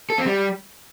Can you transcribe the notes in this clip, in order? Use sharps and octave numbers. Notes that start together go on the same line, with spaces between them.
A4
C4
G3